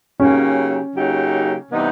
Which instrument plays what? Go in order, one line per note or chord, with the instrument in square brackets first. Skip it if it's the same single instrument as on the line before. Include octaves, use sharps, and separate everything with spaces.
[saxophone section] C#3 F#3 A#3 D#4 G4 [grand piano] C#4
[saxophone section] C#3 F#3 A#3 D#4 G4
C3 E3 G3 B3 D#4